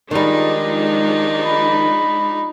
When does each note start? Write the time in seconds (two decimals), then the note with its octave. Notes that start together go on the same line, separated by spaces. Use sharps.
0.11 D#3 F3 G3 G#3 D4 D#4
1.44 B5